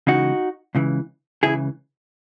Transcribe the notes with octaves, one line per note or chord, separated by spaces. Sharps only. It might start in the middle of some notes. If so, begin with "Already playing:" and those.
C#2 C#3 E3 D#4 F#4
C#2 C#3 E3
C#2 C#3 E3 E4 G#4